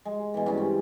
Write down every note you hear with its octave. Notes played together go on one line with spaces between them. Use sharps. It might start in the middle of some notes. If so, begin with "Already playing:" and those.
G#3
B2 E3
G2 C#4 A5
C4